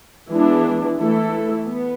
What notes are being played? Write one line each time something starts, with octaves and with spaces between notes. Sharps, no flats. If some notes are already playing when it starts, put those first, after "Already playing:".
E3 G#3 B3 D4
E3 A3 E4 A4
B3